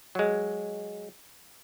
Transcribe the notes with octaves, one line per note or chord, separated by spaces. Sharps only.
F#3 G#3